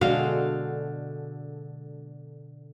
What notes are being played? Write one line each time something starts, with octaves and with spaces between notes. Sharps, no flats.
B2 D3 G#3 D4 F#4 A4 F5